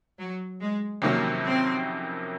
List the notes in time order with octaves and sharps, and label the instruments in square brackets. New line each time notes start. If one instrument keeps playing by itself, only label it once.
[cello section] F#3
G#3
[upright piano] F2 C3 D#3 F#3 C#4 [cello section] A#3
[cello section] C4